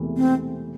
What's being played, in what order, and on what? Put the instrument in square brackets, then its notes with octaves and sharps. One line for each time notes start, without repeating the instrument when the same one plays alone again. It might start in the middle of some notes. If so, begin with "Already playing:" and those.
Already playing: [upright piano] E1 E2 C3 E3 A3
[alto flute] C4